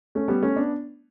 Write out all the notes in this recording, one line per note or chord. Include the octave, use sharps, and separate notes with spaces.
A3 C#4
G3 B3
A3 C#4
B3 D4